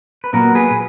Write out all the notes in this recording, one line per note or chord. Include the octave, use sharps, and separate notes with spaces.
B4
A#2 F#3 B3 F#4 A#4
G#4 B4